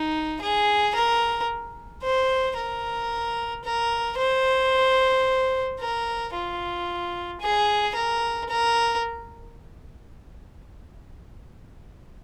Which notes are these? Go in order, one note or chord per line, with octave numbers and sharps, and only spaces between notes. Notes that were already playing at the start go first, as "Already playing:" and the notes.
Already playing: D#4
G#4
A#4
C5
A#4
A#4
C5
A#4
F4
G#4
A#4
A#4